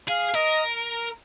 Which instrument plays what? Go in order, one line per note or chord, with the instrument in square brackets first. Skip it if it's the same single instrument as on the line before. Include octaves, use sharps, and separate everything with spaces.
[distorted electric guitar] G#4 [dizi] F5
[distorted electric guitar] A#4 [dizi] D#5